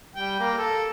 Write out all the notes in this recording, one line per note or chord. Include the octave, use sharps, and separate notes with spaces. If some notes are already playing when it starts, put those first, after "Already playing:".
G3 G5
A#3
A4